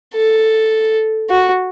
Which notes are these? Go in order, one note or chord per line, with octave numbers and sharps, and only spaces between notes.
A4
F#4